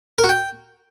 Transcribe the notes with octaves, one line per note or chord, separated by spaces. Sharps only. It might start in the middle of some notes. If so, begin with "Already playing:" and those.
A#4
F#4
G5